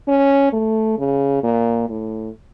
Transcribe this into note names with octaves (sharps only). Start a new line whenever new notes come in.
C#4
A3
C#3
A#2
A2